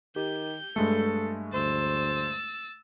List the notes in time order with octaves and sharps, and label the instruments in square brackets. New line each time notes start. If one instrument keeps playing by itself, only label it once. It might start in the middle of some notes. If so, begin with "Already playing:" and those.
[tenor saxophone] D#3 [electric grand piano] G4 [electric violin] G6
[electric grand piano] G2 G#3 A3 [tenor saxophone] A4
[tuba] D2 [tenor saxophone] C5 [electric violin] E6 A6